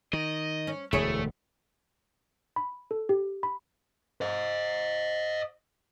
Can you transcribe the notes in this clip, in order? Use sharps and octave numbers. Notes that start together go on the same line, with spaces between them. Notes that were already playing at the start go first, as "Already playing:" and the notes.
D#3 D#5
C#4
E1 D2 A3 E4 G#4 C#5
B5
A4
G4
B5
C5 D#5